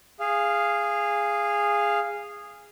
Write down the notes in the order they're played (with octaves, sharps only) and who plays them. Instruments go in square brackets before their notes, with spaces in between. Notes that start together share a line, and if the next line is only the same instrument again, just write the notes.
[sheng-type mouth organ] G#4 F5